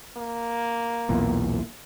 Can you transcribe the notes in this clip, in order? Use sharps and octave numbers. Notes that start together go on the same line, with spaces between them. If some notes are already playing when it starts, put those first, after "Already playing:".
A#3
B1 E2 A#2